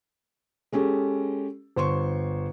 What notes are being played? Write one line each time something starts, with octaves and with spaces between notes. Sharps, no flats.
G#3 C#4 G4 A4
G1 C5 C6 C#6